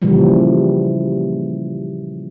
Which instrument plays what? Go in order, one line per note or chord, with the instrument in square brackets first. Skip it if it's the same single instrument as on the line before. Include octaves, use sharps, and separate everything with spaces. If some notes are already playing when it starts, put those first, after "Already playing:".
[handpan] A#2 C#3 E3 F3 G3